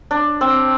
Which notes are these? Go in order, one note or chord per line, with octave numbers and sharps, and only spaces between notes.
D4
C4